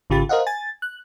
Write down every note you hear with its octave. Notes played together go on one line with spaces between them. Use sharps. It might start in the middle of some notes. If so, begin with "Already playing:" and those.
G#1 C#3 F4 G4 B5 A6
A#4 C5 D#5 F5 F#5
G#5 A6
F#6